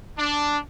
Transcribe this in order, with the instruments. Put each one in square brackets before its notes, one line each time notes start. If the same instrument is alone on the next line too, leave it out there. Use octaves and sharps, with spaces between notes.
[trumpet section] D4